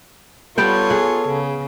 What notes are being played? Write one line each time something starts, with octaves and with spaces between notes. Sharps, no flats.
G3 B3 F4 A4 C#5 G5
G#4 F#5
C#3